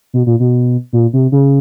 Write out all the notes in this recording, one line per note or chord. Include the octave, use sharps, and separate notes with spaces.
B2
A#2
B2
A#2
C3
C#3